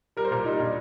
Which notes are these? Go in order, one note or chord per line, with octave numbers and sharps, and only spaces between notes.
G3 A#4
C5
A#2 A#4
G3 D#4
A#2 D4